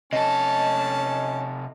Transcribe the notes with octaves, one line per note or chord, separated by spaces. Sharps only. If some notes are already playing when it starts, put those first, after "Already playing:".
C3 C#4 A4 D#5 A5